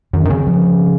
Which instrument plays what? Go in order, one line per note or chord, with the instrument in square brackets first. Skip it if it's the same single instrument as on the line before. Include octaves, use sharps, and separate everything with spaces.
[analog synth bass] F#2 [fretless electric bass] D#3
[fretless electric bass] C#4
[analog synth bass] D#3
[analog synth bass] C#3 [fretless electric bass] C4
[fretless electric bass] F3